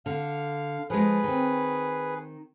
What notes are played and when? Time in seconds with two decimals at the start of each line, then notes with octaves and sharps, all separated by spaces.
0.06 D3 F5
0.90 F3 G#3 G#4 B4
1.24 D#3 C4